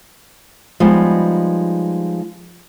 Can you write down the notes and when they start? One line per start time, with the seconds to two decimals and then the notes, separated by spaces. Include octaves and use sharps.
0.80 F3 G3 G#3 B3 D#4